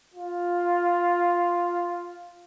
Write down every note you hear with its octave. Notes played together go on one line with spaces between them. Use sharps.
F4